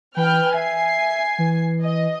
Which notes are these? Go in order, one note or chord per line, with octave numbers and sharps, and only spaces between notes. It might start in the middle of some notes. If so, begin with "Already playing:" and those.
E3 B4 G5 F6
E5 G#5 C7
E3
D#5